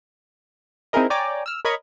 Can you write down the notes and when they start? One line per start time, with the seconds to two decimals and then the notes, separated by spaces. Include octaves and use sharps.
0.93 C4 D#4 E4 G#4 A#4 D#5
1.10 C#5 D5 G5 G#5 A#5 D6
1.46 E6 F6
1.65 A#4 C#5 D#5 B5 C#6 G#6